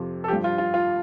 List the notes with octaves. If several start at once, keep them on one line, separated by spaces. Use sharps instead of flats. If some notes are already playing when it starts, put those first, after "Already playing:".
Already playing: F2 C3 F3
A4
G2 F3 G4
F4
F4
F4